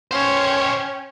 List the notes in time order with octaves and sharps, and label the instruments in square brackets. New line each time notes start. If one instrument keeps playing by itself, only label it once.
[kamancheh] C#4 G5 [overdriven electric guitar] C5 C#5